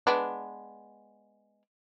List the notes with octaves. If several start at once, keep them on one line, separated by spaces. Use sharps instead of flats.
G#3 B3 D4